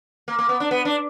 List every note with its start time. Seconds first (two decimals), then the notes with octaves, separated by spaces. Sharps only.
0.28 A#3
0.39 A#3
0.49 B3
0.60 D4
0.71 B3
0.85 D4